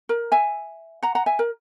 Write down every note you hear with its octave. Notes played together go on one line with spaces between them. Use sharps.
A#4
E5 G#5
F#5 A#5
F#5 A#5
E5 G#5
A#4